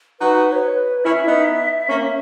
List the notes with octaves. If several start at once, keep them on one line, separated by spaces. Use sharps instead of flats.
D#4 F#4 B4
C#5
B4
C#4 E4 E5
B3 D#4
A#3 C#4